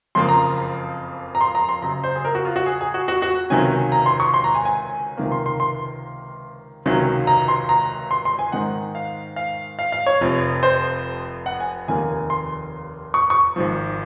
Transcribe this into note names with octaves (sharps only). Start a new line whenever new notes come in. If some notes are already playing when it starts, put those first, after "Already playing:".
F#1 F2 C#3 F3 A#3 C6
A#5
A#5
C6
A#5
C6
F#1 F#2 C#3 A#5
C5
G#4
A#4
F#4
F4
F#4
G#4
G#4
F#4
F#4
F#4
C#2 C3 D#3 F#3 C#4 G#5
A#5
C6
C#6
C6
A#5
G#5
G#5
C#2 C3 D#3 A#3
C6
C6
C6
C#2 C3 D#3 F#3 C#4
A#5
C6
A#5
C6
C6
G#5
G#2 D#3 G#3 D#4 F#5
F5
F5
F5
F5
C#5
F1 F2 C3 F3
C5
F#5
G#5
F1 D#2 D#3 A#3 G#5
C6
C#6
C#6
G#1 G#2 F3